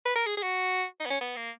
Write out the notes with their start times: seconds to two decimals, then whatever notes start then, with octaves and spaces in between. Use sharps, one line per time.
0.05 B4
0.16 A#4
0.26 G#4
0.37 G#4
0.43 F#4
1.00 D#4
1.06 B3
1.10 C#4
1.21 B3
1.36 A#3